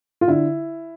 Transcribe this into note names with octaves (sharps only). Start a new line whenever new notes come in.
F4
D3 E4